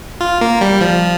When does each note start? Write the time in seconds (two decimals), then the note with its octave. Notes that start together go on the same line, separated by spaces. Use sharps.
0.21 F4
0.41 A#3
0.61 G3
0.81 F3